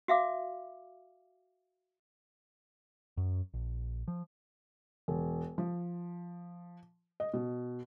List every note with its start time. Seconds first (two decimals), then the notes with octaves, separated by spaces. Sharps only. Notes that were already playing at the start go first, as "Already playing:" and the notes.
0.08 F#4 E5 F5 D6
3.17 F#2
3.54 A#1
4.08 F3
5.08 E1
5.58 F3
7.20 D#5
7.34 B2